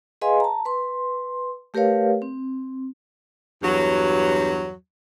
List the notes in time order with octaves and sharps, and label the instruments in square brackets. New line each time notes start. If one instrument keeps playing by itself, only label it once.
[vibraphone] G#4 B4 D#5 F5 G#5 C6
A5 A#5
B4 C6
A3 G4 A#4 B4 C#5 F5
C4
[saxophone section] E2 G2 F#3